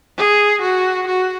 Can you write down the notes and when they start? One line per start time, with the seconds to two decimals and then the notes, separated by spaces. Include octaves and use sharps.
0.18 G#4
0.62 F#4
1.07 F#4